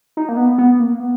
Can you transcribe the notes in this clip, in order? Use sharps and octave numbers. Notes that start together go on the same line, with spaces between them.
D#4
A#3
B3
B3
A#3
B3